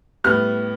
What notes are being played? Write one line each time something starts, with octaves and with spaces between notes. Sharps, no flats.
A2 G3 B3 F6